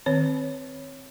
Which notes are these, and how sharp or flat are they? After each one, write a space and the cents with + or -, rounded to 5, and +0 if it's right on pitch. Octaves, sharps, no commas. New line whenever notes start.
D#3 +0 C4 +0 C#5 +0